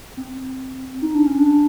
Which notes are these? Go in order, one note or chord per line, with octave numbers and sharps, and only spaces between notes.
C4
D#4
D4
C#4
D4